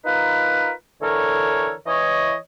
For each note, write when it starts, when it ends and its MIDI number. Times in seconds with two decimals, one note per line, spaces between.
0.05 0.71 63
0.05 0.71 65
0.05 0.71 70
0.05 0.71 71
1.02 1.73 50
1.02 1.73 52
1.02 1.73 69
1.02 1.73 70
1.02 1.73 73
1.87 2.35 52
1.87 2.35 73
1.87 2.35 75